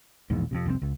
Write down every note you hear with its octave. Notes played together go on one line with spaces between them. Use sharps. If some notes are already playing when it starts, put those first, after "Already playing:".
E1 A#1 E2 G#2
F2 G#2 C3
F1 C2 C3 C4
C#2